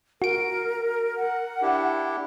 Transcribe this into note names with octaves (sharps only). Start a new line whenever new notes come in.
F#4 A#4 D7
F#5
D4 E4 G4